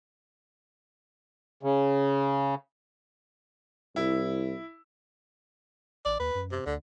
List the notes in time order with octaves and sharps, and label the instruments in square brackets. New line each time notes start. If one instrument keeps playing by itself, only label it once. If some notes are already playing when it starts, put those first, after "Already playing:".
[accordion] C#3
[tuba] C2 [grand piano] E4
[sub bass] A1 [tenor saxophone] D5
[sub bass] D#2 [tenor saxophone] B4
[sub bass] F#2
[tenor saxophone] C3
[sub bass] D2 [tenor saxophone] D3